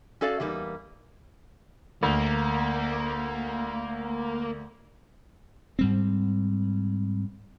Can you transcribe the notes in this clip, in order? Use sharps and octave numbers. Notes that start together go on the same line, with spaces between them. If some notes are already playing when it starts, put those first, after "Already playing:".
C#4 F#4 A4 D5 F5
E2 G3 A#3 D#4
D2 A#3
G#2 G3 C4